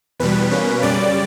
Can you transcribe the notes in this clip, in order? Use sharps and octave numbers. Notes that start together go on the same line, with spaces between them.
E2 B2 G3 B4
B2 A#3 C#4
F#2 C#3 G3 D5